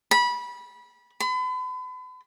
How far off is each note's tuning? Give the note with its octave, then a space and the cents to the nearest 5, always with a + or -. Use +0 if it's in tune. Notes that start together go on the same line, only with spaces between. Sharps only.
B5 -20
B5 +40